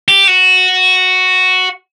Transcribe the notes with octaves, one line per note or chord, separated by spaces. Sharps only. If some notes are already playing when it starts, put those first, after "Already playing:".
G4
F#4